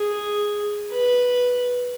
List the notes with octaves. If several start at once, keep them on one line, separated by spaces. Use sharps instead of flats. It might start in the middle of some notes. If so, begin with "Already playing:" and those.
Already playing: G#4
B4